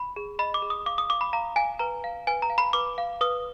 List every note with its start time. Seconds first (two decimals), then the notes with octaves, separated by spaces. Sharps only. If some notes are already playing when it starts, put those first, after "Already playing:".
Already playing: B5
0.16 G#4
0.39 D#5 B5
0.54 D6
0.62 G#4
0.70 D#6
0.86 F5 D6
0.98 D#6
1.09 F5 D6
1.21 B5
1.33 F5 A#5
1.56 F5 G#5
1.79 B4 A#5
2.04 F5
2.27 B4 G#5
2.42 A#5
2.50 F5
2.58 B5
2.73 B4 D6
2.98 F5
3.21 B4 D#6